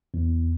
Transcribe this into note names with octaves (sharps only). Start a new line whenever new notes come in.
E2